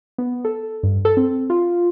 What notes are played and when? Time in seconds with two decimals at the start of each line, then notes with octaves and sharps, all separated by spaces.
0.18 B3
0.45 A4
0.83 G2
1.05 A4
1.17 C4
1.50 F4